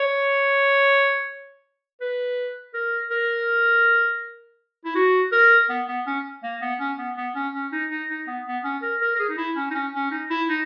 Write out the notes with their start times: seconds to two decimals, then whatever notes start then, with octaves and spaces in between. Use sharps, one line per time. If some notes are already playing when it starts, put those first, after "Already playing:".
Already playing: C#5
2.01 B4
2.74 A#4
3.10 A#4
4.85 E4
4.95 F#4
5.32 A#4
5.69 B3
5.88 B3
6.07 C#4
6.43 A#3
6.61 B3
6.79 C#4
6.98 B3
7.17 B3
7.35 C#4
7.54 C#4
7.72 D#4
7.90 D#4
8.09 D#4
8.27 B3
8.46 B3
8.64 C#4
8.82 A#4
9.01 A#4
9.15 A#4
9.19 G#4
9.29 D#4
9.37 E4
9.56 C#4
9.70 D#4
9.74 C#4
9.93 C#4
10.11 D#4
10.30 E4
10.49 D#4